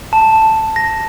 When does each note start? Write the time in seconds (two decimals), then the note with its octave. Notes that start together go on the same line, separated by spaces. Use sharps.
0.13 A5
0.76 A#6